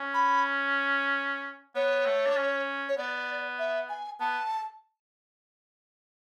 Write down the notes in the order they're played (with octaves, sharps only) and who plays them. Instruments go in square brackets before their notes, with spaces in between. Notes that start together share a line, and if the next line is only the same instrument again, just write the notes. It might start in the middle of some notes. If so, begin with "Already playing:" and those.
Already playing: [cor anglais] C#4
[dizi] B5
[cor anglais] B3 [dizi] C#5
[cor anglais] A3
D4
C#4
[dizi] C#5
[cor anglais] B3 [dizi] D5
[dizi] E5
G#5
[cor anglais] B3 [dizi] A5